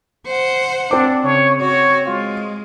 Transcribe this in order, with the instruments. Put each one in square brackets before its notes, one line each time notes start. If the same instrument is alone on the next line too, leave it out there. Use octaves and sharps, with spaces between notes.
[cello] C5 F#5
[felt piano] C4 D6 [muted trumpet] D4
[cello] C#3 [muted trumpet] C#5
[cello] F#4 [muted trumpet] C#5
[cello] G#3 [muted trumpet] F4